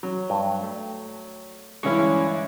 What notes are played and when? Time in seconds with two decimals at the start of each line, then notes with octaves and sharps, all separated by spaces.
0.03 F#3
0.30 G2
0.63 A3
1.83 G2 D3 E3 G#3 C#4 D4 E4 C#6